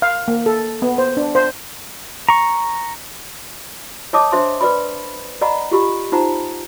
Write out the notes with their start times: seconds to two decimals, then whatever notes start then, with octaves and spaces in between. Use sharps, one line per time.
0.02 F5
0.28 A#3
0.46 A4
0.82 B3
0.98 C5
1.17 D4
1.35 C5
2.29 A#5 C#6
4.13 C#5 D#5 A5 D6 D#6
4.32 D4 C5 E5 C6
4.61 B4 D5 B5
5.41 D5 D#5 F#5 A#5 B5
5.71 F4 G4 B5
6.12 D#4 F4 C5 F#5 A#5